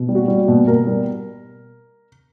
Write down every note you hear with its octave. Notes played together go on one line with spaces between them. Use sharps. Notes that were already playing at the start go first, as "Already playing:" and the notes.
Already playing: B2
G3
F#4
G3
B2
B2 A#4
G3